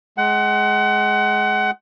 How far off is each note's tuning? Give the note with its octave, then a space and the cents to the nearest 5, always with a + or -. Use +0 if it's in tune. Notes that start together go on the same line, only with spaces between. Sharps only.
G#3 +15 F#5 +30